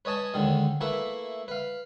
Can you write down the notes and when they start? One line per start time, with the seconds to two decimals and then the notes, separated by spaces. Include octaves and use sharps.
0.05 B4 C#5 D#5 G#5 A5
0.34 D#2 D3 D#3 G#3
0.81 A3 A#3 E4 B4 E5
1.48 B4 F5